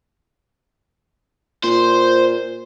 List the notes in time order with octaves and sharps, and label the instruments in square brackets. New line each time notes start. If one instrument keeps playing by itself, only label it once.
[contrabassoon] A#2 [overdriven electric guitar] C5